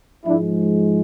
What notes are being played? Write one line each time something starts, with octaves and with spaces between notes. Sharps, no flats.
G#2 F3 G#3 D4 E4